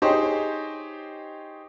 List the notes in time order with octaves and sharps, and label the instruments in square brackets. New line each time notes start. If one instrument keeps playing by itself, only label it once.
[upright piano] D#4 G4 G#4 C5 C#5 D#5